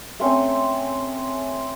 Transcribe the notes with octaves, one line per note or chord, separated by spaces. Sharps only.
A3 C4 C#4